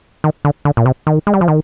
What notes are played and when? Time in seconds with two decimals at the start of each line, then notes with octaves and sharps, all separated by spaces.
0.24 D#3
0.45 D3
0.65 D3
0.77 A#2
0.86 C3
1.07 D#3
1.27 G#3
1.34 G3
1.41 F3
1.48 D#3